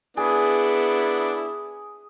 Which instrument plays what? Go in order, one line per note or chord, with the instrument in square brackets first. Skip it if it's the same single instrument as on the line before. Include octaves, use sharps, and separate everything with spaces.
[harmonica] B3 D4 E4 [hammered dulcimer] G#4